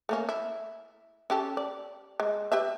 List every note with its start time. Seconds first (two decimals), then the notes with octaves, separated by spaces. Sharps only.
0.09 A3 A#3 C#4
0.29 E4
1.30 C#4 G4 A4
1.57 D5
2.20 G#3
2.52 G4 B4 E5